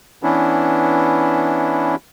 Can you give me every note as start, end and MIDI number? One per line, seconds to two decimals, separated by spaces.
0.23 1.95 52
0.23 1.95 59
0.23 1.95 61
0.23 1.95 62
0.23 1.95 64